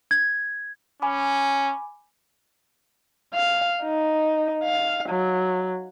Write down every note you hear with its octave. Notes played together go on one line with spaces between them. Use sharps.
G#6
C#4 G#5 B5 D6
F5
D#4
F5
F#3